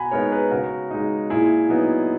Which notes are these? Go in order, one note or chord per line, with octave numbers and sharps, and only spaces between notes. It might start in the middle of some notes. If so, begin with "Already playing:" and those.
Already playing: B2 F#5 G#5 A#5 B5
G#3 B3 D#4 A#4 C#5
G#4 B4
C#3 F#4 A#4
G#3 D#4
A#2 E4 G#4
F#3 B3 D#4